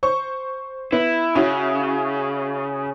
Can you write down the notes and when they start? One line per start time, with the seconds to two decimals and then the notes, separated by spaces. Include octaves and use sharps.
0.03 C5 C#6
0.92 B3 E4
1.35 C#3 C#4 E4 F#4